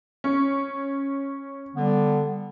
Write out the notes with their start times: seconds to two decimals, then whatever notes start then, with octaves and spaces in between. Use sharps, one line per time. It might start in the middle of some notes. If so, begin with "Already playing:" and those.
0.24 C#4
1.76 D3 G3 B3